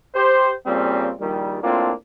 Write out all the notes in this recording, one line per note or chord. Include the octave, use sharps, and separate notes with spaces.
G4 C5
A#2 C#3 G3 C4
A#1 D#3 G3
A2 A#3 C4 D4 F4